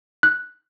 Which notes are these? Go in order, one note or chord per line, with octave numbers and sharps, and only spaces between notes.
F#6